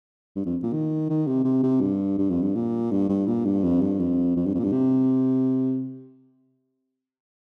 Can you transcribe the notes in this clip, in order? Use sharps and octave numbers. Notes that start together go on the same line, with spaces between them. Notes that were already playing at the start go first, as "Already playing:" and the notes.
G2
F2
A#2
D#3
D#3
C3
C3
C3
G2
G2
F2
G2
A#2
G2
G2
A#2
G2
F2
G2
F2
F2
G2
F2
A#2
G2
C3